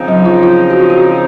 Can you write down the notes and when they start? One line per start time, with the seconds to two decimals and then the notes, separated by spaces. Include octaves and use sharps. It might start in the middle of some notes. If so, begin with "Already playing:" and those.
Already playing: C#3 F3 C4 D#4
0.08 F#3
0.25 F4
0.43 F4
0.70 F#4
0.81 F4
0.90 F#4